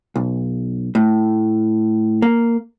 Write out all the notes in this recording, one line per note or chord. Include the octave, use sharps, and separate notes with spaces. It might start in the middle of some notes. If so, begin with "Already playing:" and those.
B1
A2
A#3